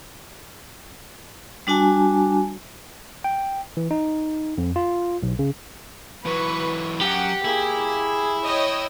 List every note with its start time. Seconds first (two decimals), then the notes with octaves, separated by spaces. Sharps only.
1.67 G3 D4 F#4 G#5 A5
3.24 G5
3.77 E3
3.91 D#4
4.58 F2
4.76 F4
5.23 B1
5.39 C#3
6.26 E3 F#3 B4 C#6
7.01 F#2 G4 F#5
7.45 A#3 E4 G#4
8.44 C#5 D#5 G5